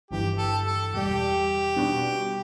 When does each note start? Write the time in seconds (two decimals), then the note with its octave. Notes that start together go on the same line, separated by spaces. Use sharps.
0.11 G1 G2 E3 G4
0.38 A4
0.66 A4
0.93 E2 B2 G3 G4
1.76 B2 G3 B3 D4 F#4